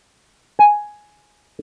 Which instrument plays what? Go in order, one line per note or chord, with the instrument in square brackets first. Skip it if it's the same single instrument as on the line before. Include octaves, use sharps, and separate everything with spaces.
[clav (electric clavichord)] G#5